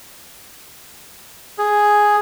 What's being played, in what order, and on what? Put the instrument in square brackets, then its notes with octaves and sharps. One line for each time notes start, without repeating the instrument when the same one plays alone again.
[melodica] G#4